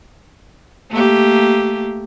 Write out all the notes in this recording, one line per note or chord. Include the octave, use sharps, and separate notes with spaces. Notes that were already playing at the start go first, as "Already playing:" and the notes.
A3 A#3 G4